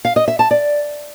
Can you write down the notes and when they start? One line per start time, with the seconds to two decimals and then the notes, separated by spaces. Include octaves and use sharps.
0.05 F5
0.16 D#5
0.28 E5
0.39 A5
0.51 D5